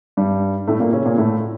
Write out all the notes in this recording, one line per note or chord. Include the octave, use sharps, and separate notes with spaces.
G2 G3
A2 A3
A#2 A#3
C#3 C#4
A#2 A#3
A2 A3